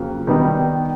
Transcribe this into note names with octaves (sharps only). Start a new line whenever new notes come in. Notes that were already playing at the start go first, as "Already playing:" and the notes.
Already playing: F2 C#3 F#3 A#3
D#3 G3 B3 D#4